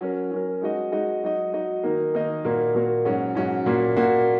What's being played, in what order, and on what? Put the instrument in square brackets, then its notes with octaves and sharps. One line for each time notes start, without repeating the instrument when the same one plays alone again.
[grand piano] F#3 C#4 A#4
F#3 C#4 A#4
G#3 D#4 F#4 D#5
G#3 D#4 F#4 D#5
F#3 D#4 F#4 D#5
F#3 D#4 F#4 D#5
D#3 A#3 D#4 A#4 D#5
D#3 A#3 D#4 A#4 D#5
A#2 A#3 F#4 A#4
A#2 A#3 F#4 A#4
G#2 F#3 C#4 F#4
G#2 F#3 C#4 F#4
A#2 A#3 F#4
A#2 A#3 F#4